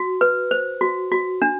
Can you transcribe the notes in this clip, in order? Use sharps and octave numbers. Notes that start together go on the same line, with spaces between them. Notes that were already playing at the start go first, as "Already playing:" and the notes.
Already playing: F#4
B4
C5
F#4
F#4
D4